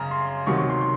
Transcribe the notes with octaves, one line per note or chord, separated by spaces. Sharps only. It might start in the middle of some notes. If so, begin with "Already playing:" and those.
Already playing: F#2 C#3 A#5
C6
D2 C3 D#3 F#3 C#6
C#6
C6
C6